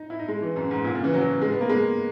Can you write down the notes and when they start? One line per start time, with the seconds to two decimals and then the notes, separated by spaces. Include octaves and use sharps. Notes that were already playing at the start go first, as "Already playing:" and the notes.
Already playing: D#4
0.10 E4
0.19 D#4
0.28 G#3
0.42 E3
0.56 F#2
0.71 G#2
0.84 A#2
0.95 C#3
1.04 E3
1.14 F#3
1.41 G#3
1.51 B3
1.61 A#3
1.69 G#3